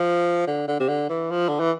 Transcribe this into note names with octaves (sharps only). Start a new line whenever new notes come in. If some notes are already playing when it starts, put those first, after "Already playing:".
Already playing: F3
D3
D3
C3
D3
E3
F3
D3
E3